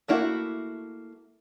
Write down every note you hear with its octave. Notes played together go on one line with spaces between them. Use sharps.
A3 A#3 E4 F#4